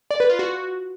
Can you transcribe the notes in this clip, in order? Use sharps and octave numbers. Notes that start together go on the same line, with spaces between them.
D5
B4
F4
F#4